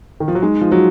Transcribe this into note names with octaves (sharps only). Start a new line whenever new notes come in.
D#3
F3
F#3
G#3 D#4
F3
F#3 F#4